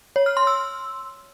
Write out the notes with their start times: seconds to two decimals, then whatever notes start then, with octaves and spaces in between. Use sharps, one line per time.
0.16 C#5
0.26 F6
0.37 C6
0.47 E6